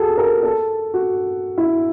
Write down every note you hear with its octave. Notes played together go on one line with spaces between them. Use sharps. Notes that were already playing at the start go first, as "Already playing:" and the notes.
Already playing: F#4 G#4 A4
A#4
A4
F#4
E4